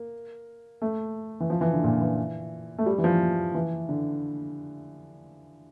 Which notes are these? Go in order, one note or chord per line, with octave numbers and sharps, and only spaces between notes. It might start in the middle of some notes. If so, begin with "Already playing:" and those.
Already playing: A#3
A3
E3
F3
E3
D3
A#2
E3
A3
G3
E3
F3
E3
D3